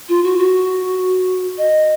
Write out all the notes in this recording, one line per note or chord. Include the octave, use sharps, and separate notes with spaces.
F4
F#4
F#4
D#5